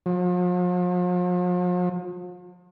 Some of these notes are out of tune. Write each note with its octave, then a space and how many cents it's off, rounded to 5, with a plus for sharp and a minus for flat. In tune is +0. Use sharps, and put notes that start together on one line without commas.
F3 +40